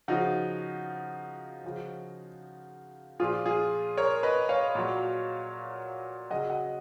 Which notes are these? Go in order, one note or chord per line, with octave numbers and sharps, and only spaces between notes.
C#3 F3 D#4 F#4
C#3 F3
A#2 F3 F4 G#4
F4 G#4
A#4 C#5
B4 D#5
C#5 F5
A#2 F#3
C#3 F#3 D#5 F#5
D#5 F#5